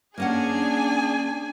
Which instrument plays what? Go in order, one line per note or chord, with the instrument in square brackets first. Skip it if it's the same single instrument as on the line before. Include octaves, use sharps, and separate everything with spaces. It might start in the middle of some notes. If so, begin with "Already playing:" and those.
[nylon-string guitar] A#3 C#4 F#5 [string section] D4 G#4 [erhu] G#5